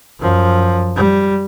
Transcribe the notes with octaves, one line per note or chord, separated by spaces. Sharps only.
F#2 F3
G3